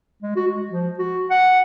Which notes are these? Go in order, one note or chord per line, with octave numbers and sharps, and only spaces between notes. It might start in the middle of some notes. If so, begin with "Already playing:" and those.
G#3
F#4
G#3
F3
F#4
F#5